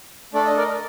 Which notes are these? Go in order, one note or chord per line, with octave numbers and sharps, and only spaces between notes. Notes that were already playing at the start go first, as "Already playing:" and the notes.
A3 D4 A4 D5
D#5
A#4 D5